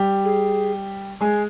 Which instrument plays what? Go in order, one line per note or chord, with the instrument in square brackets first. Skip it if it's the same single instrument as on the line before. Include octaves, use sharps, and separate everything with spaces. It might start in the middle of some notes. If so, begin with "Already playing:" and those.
Already playing: [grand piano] G3 G4
[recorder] G#4
[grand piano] G#3 G#4